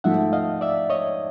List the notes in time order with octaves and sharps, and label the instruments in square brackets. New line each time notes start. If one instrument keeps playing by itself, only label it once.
[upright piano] G#2 F3 A3 [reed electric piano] E5 F#5
[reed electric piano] D#5 F5
D5 E5
C#5 D#5